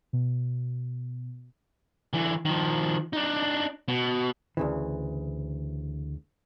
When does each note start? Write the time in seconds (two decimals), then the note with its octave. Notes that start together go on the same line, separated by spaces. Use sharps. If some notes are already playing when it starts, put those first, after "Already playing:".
0.13 B2
2.14 D3 E3
2.45 D#3 F3
3.13 D4 D#4
3.88 B2
4.57 D2 C#3 E3